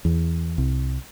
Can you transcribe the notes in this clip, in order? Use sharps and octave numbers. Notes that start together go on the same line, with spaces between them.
E2
C2